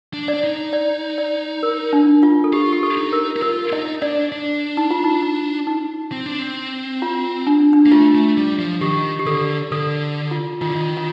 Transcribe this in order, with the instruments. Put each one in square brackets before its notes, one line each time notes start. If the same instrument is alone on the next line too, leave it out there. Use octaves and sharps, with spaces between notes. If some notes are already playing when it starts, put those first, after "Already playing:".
[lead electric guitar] D4
[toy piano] D5
[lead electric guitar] D4
D#4
[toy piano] D5
D5
A#4
D4
F4
A4
[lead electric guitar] F4 [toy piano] G4
[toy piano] G4
A4
[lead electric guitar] D#4
[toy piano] A#4
[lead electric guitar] D#4
[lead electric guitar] F4 [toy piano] A#4
[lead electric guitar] D#4 [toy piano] D#5
[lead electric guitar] D4 [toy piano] D5
[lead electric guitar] D4
[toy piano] D#4
F4
D#4
D#4
D#4
[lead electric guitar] C4
D4
C4
[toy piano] F4
D4
D4
[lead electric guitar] A#3
[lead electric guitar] A3 [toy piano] F4
[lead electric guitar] A3
G3
F3
[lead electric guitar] D#3 [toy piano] G4
[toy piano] G4
[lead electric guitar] D3 [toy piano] A4
[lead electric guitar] D3 [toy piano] A4
[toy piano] F4
[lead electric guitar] D#3 [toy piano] F4
[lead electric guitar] D3
D#3
[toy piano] F4